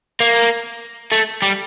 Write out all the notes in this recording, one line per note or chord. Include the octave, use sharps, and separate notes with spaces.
A#3
A3
G3